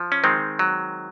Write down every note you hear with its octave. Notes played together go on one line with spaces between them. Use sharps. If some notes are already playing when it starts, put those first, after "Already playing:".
Already playing: F3
C#4
D#3 G#3 C4
F#3